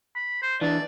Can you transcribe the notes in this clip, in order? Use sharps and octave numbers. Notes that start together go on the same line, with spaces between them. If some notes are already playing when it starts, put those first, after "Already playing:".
B5
C5
E3 D4 D5